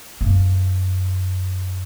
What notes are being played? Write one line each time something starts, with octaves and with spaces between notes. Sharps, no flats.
F#2 A#3